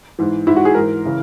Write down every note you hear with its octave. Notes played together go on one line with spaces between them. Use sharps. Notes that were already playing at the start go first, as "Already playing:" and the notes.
G#2 E3
G#2 E3 E4
F#4
G#4
G#2 E3 A#4
C#3 E3